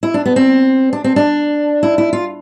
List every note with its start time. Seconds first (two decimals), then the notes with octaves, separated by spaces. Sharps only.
0.03 E4
0.14 D4
0.26 B3
0.36 C4
0.93 D4
1.04 C4
1.16 D4
1.83 E4
1.98 E4
2.13 F4